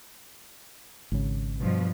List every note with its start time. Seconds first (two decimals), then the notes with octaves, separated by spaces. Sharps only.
1.12 G#1 C#3
1.59 G2 B2 F3